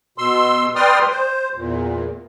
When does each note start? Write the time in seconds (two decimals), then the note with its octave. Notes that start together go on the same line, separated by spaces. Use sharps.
0.18 B2 C6 E6
0.75 B4 D5 G5 C6 D#6 F6
1.10 C5
1.56 E2 A#2